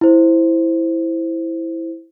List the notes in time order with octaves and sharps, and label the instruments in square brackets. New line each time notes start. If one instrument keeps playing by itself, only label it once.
[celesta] E4 C5